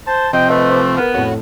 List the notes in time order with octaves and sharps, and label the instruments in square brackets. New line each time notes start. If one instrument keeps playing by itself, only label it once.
[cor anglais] C5 [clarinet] A5
[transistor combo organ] C3 F3 C4 [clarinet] D#5 [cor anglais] G5
[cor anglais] A3 [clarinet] B4 [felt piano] D#5
[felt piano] C5 D6
[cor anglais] B3 [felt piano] A#4 F6 [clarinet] B4
[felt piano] F2 A2 [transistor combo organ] F#4 [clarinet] C#5